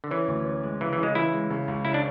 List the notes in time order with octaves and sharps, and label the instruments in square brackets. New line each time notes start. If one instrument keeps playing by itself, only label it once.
[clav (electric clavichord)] D3
[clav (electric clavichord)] E3 [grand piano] C#4
[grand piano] D2
C#4
G#3
[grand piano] C#3 [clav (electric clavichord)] E3
[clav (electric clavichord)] E3
[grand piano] C#3
[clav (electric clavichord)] G#3
[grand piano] E3 [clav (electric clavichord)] E4
[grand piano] G#3
C#3
C#2
[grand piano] C#3 [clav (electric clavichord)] E4
[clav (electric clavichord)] D4